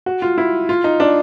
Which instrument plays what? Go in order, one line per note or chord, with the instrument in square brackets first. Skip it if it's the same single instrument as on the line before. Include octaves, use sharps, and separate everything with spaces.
[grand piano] F#4
F4
E4
F4
D#4
D4